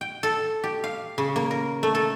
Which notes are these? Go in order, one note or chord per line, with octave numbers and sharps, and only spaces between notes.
G5
A4
G4
F5
C#3
A#3
A#4
A3
A4